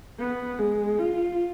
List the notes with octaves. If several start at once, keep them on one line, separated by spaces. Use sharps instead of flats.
B3
G#3
F4